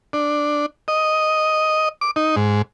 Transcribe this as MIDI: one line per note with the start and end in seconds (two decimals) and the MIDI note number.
0.13 0.66 62
0.88 1.89 75
2.01 2.11 86
2.16 2.36 63
2.36 2.62 44